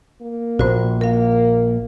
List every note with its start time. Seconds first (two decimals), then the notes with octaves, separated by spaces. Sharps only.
0.21 A#3
0.59 A#1 A#2 F#4 C5
1.01 A#3 A#4 F5